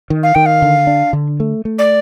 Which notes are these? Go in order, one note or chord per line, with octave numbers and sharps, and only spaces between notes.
D#3
F5
D#3 G5
F5
D3
D4
D3
A3
A3
D5